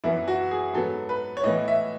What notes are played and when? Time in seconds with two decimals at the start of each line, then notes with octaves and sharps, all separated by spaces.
0.04 F#2 E3 B3 E4
0.28 F#4
0.51 G#4
0.74 G#2 F#3 B3 A4
1.09 B4
1.37 C#5
1.44 A2 E3 B3 D#5
1.68 E5